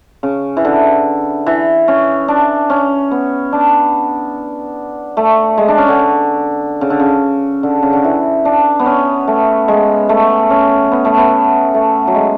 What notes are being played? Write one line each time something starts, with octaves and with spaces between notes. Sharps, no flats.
C#3
E3
D3
E3
C#4
D4
C#4
B3
D4
A3
G#3
D4
C#4
D3
C#3
D3
C#3
D3
C#3
D3
E3
D4
B3
C#4
A3
G#3
A3
C#4
B3
A3
B3
A3
F#3
G#3